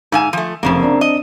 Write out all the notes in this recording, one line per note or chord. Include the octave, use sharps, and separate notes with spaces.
G#2 F5 G#5 E6 E7
F3 A3
F1 F#2 C#3 A#3 C4 E7
C4 D4
D#5